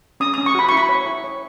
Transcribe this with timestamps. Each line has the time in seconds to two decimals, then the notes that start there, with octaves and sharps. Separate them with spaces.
0.20 C#4 D#6
0.34 D#6
0.38 C#4
0.46 C#6
0.55 F#4 B5
0.69 E4 C#6
0.77 B5
0.89 C#5
1.06 E4
1.24 C#5